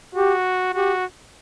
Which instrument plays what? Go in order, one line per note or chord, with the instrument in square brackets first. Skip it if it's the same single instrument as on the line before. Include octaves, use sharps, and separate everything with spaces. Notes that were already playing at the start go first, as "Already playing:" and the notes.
[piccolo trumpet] F#4 [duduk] G4
[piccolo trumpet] F#4 [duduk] G4